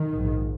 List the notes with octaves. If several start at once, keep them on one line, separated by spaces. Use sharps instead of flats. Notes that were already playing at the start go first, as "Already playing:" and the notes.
Already playing: D#3
A#1 G#2